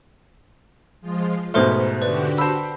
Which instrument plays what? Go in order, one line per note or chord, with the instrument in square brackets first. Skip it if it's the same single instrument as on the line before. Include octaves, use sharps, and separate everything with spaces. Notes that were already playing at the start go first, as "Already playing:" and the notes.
[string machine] F3 G#3 F4
[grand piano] G#2 B2 A3 [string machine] B3 [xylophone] C5 C6 F6
[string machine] D3 F#4 G4 [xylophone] B4 D5
[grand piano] C5 B5 [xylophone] A5 E6